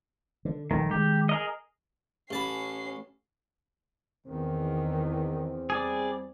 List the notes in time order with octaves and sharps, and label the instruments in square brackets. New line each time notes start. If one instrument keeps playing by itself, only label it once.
[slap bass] D3
[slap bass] A#1 G3 A3 [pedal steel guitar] D#3
[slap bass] D#3 G#3 [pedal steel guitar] G4
[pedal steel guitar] G#4 A#4 D#5
[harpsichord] A1 A5 B5 [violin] C#4 C7
[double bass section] E2 [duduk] D#3 [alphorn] C4
[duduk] G3 [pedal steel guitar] G#4 D5